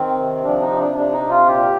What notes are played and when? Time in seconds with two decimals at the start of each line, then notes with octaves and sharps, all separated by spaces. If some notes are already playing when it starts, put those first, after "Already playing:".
Already playing: D#3 C4
0.18 C3
0.44 F3 D4
0.61 D#4
0.70 C3
0.78 D4
0.95 C3 D4
1.12 D#4
1.21 C3
1.30 F4
1.47 A#2 G4